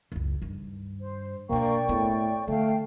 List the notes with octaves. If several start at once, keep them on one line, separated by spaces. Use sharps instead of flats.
F#1 C#2
G2 D#3
C5
B2 A#3 D4 D5 G5 C#6
A2 B3
D3 A3 F5 G5